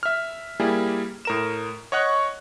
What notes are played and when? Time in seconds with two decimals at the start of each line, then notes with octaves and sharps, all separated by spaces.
0.03 E5 F6
0.60 G3 A#3 E4 G4 G#4
1.25 A2 A#4 E7
1.92 C#5 D#5 F#5 C#6 F#6